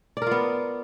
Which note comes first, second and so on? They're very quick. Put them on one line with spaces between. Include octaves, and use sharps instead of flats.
D5 A#4 F4 B3